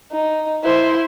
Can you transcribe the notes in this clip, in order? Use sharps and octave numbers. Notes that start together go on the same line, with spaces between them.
D#4
E4 C5